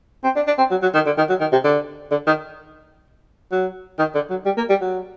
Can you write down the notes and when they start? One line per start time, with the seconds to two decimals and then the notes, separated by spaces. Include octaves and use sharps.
0.24 C4
0.36 D4
0.47 D4
0.58 C4
0.71 F#3
0.82 F#3
0.94 D#3
1.06 D3
1.17 D#3
1.29 F#3
1.41 D#3
1.52 C3
1.64 D3
2.11 D3
2.27 D#3
3.52 F#3
3.99 D#3
4.15 D3
4.30 F#3
4.46 G3
4.57 A#3
4.70 G3
4.81 F#3